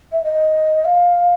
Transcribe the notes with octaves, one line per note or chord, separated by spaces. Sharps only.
E5
D#5
F5